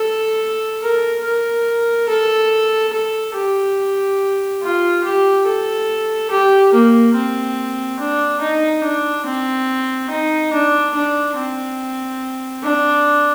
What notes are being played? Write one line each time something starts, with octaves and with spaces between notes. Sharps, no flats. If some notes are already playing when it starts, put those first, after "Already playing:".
Already playing: A4
A#4
A#4
A4
A4
G4
F4
G4
A4
G4
A#3
C4
D4
D#4
D4
C4
D#4
D4
D4
C4
D4